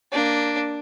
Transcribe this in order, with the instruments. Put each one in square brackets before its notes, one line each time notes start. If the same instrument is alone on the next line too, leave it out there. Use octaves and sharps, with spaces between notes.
[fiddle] A#3 D4